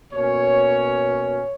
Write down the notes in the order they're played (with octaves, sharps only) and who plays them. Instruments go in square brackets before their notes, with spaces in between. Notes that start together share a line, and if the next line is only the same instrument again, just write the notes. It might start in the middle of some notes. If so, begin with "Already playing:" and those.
[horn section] B2 A#3 C#4 C#5